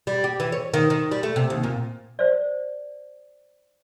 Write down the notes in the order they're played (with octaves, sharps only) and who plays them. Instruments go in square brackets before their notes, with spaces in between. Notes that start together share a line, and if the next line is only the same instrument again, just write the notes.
[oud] G3
G4
E3
C#5
D#3
D#3
G3
A3
C3
D#2
A#2
[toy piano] C5 D5